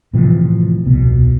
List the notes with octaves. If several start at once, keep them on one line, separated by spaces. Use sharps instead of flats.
A2 C3 E3 F3
D#1 C2 B2